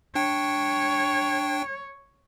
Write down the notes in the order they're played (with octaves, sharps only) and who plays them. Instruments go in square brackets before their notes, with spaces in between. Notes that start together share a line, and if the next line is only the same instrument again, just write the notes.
[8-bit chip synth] D4 G5 [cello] C#5